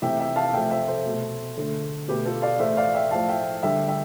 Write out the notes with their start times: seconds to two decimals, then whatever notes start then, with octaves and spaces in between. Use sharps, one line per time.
0.02 C3 E3 A3 E5 G5
0.19 E5 G5
0.36 F5 A5
0.53 C3 F3 A3 E5 G5
0.71 C5 E5
0.88 A4 C5
1.06 B2 A3
1.57 D3 A3
2.08 B2 A3 G4 B4
2.25 F4 A4
2.42 D5 F5
2.59 A2 E3 A3 C5 E5
2.77 D5 F5
2.94 E5 G5
3.11 A2 F3 A3 F5 A5
3.29 E5 G5
3.63 D3 G3 E5 G5
3.88 E5 G5